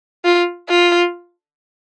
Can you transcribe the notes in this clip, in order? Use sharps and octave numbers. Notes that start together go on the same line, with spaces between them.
F4
F4